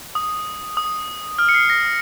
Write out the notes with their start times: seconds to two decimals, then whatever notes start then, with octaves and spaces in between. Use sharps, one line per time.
0.15 D#6
0.77 D#6
1.39 F6
1.49 C#7
1.54 C7
1.70 A#6